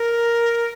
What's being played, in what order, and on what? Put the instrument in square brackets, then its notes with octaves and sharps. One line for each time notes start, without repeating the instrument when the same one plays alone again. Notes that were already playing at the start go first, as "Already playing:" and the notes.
Already playing: [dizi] A#4